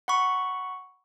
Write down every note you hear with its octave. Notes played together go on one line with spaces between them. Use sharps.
F#5 B5 C#6